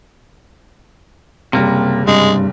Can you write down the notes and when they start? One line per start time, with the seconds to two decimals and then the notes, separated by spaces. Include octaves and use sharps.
1.53 F#1 C3 G3 A#3
2.08 G2 C3 G#3